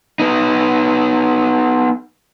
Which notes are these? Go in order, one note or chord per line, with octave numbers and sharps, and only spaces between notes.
B3 D#4